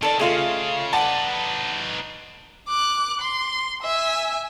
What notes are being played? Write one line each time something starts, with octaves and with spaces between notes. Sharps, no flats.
D#3 A4 D5
C#3 A3 F4 G#4 D#5 F5
D#4 B4 D5 F#5 A5 D6
D6 F#6
C6
E5 G#5